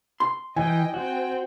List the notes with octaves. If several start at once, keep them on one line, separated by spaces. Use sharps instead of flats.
C6
E3 D#5 G5 G#5
C4 F#4 G5